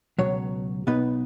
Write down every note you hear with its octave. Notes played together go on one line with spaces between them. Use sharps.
C#2 B2 F#3 C#5
B1 B2 B3 D#4 B4